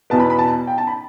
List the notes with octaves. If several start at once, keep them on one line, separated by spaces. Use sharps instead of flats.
E2 B2 B3 A5
B5
B5
A5
G5
A5
B5